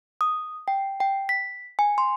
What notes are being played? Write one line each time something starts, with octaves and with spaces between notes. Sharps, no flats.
D#6
G5
G5
B6
G#5
C6